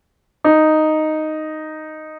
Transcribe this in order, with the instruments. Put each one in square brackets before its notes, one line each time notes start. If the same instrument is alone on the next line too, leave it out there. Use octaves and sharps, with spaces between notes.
[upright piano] D#4